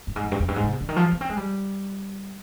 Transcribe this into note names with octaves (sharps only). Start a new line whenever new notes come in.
G2
G#2
F2
G2
F2
G2
G#2
C3
B2
D3
D#3
F3
B3
C4
G#3
G3